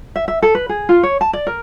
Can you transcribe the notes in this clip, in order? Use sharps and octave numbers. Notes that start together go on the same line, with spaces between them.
E5
E5
A4
B4
G#4
F4
C#5
A5
D5
A#4